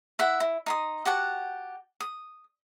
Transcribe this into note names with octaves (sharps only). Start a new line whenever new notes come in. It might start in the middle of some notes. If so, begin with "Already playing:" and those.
E4 E5 F#5
E4
D#4 C6 D#6
F#4 G4 F#5 A5
D#6